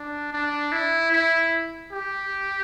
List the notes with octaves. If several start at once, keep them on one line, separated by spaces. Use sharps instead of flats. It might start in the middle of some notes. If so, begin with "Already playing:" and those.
Already playing: D4
D4
E4
E4
G4